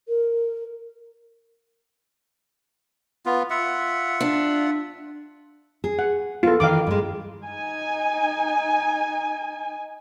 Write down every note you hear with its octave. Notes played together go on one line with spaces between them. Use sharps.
A#4
B3 F4
F4 E5 F#5
D4
G#4
F#5
B3 F4 A4
D#3 E3 F5 D6
G2 G#3
D#4 G#5